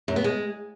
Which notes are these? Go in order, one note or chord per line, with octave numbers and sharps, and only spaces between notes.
F#2
B3
G#3